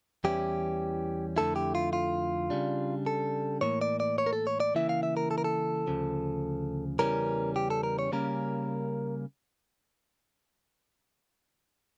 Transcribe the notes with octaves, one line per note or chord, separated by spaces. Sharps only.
E2 E3 G3 C#4 E4 G4
F2 D3 A3 E4 A4
G4
F4
F4
C#3 G3 D4
A4
A2 E3 A#3 C#5
D5
D5
C#5
A#4
A4
C#5
D5
C#3 E3 A#3 E4 E5
F5
E5
A#4
A4
A#4
A4
D2 C#3 F3
E2 C#3 E3 G3 C#4 A#4
G4
A4
A#4
C#5
C#3 G3 A#3 C#4 A#4